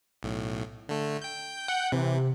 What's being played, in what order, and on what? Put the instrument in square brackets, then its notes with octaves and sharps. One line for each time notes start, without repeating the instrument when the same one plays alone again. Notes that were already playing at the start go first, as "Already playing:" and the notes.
[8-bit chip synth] B1 A2
D3 A3
G5 G6
[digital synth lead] F#5
[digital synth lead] C3 [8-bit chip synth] E3